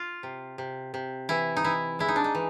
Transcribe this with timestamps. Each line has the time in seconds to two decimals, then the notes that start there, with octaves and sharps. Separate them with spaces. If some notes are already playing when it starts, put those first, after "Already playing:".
Already playing: F4
0.23 C3
0.58 C3
0.94 C3
1.29 E3 E4
1.57 D#4
1.64 E3 E4
1.99 G#3 E4
2.08 D#4
2.16 D4
2.24 D#4
2.35 E3